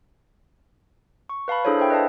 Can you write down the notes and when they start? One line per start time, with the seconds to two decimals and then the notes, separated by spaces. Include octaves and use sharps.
1.29 C#6
1.48 B4 F5 A5 B5
1.65 D4 E4 G#4 A4 C5 C#5
1.79 C5 E5 G5
1.90 B4 D#5 F5 A5